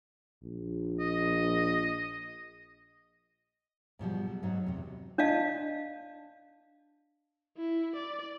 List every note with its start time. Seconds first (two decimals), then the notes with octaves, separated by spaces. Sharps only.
0.43 A#1
1.00 D#5
3.99 G#2 B2 F3 G3
4.27 F#3
4.43 G#2 F#3 D#4
4.66 E2 C3
5.18 D4 D5 D#5 F5 A5
7.57 E4
7.96 D5